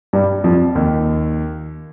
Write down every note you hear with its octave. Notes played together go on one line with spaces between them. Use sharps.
G2 G3
F2 F3
D#2 D#3